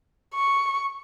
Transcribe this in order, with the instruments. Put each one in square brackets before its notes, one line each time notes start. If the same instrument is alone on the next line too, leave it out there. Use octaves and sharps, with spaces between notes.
[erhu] C#6